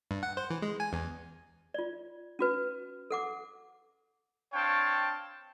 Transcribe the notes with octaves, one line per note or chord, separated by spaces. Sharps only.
G2
F#5
C5
E3
G#3
G#5
E2
F4 D5
C#4 F#4 B4
A4 F#5 D6
C4 D4 C#5 F5 G5 A5